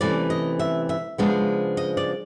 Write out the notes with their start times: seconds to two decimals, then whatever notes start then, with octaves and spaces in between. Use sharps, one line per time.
0.01 C3 E3 A3 C#4 D5
0.30 D#5
0.59 E5
0.89 E5
1.18 C#3 F3 G#3 B3 D4
1.77 D#5
1.97 D5